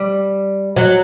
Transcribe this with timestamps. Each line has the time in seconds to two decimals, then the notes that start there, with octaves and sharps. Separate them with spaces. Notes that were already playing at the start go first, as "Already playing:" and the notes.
Already playing: G3
0.76 F#3